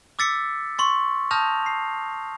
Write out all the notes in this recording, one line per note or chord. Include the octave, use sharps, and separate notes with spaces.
D6 E6 A6 B6 C#7
C6 C#6 A6
A5 D#6 F6 G6 A#6 F7
C7